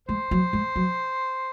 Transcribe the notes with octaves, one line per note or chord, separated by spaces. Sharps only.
G#3 C5
F#3
G#3
F#3